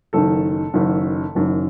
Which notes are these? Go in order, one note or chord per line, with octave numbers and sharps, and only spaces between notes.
F#1 F#2 D#3 A4
F#1 F#2 D#3
F#1 F#2 D#3